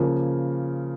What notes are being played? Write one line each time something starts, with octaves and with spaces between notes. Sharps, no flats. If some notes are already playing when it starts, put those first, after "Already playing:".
Already playing: C#3 F3 A#3